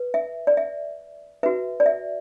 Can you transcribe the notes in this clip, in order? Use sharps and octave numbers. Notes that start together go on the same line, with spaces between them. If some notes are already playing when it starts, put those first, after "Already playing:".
Already playing: B4
E5
D5
E5
F#4 B4 E5
D5
E5